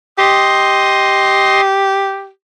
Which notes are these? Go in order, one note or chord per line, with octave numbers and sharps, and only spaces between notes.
G4 D#5 C6